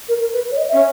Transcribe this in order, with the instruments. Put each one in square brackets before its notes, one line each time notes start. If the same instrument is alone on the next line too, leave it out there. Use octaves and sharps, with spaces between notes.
[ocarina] A#4
A#4
B4
C#5
D#5
[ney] C#4 [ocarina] E5